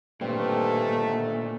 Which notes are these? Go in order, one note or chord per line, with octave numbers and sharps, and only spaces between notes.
G2 A#2 D3 D#3 A3 C4